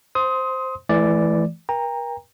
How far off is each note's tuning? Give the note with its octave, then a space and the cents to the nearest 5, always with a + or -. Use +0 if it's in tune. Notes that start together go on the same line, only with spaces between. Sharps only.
C5 +0 C6 +0 D#6 +25
E3 +10 A3 -30 D5 +0
A#4 +40 G5 +35 A#5 +0